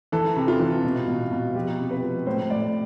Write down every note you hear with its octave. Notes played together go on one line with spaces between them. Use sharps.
E3 A4
C3
F4
E3
B2
B2
B2
F3 G4
C3
B4
F3
A2 C5
A2 D5